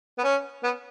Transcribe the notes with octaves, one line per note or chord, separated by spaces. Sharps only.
B3
C#4
B3